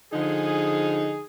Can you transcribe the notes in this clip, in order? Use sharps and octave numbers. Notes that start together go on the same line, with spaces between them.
D3 F3 D#4 G#4